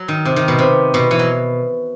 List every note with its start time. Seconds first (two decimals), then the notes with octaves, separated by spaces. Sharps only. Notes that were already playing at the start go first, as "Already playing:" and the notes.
Already playing: F#3
0.08 D#3
0.25 C3
0.36 D#3
0.48 B2
0.59 C3
0.94 B2
1.11 E3
1.19 F#3